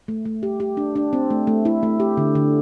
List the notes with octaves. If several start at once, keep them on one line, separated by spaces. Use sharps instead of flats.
A3
A3
G4
G4
D4
D4
C4
A3
A3
E4
A3
G4
D3
D3